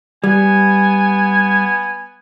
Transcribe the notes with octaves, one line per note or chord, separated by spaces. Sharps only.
G3 B3 G#5